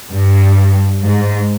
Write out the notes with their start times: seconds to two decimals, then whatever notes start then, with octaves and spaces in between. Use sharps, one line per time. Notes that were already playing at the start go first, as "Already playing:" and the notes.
0.12 G2
1.04 G#2